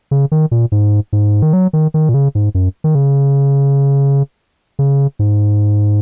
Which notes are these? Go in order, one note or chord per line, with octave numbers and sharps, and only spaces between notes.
C#3
D#3
A#2
G#2
G#2
D#3
F#3
D#3
D#3
A#2
C#3
G#2
F#2
D#3
C#3
C#3
G#2